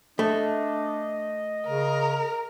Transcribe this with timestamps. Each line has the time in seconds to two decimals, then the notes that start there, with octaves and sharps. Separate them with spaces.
0.19 A3 D4 D#5
1.67 C#3 A#4